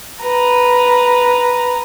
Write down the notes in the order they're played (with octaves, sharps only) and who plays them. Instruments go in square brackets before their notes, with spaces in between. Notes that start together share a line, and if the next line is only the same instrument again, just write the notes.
[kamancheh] B4 A#5